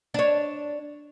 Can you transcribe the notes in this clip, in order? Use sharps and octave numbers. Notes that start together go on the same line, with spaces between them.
D4 C#5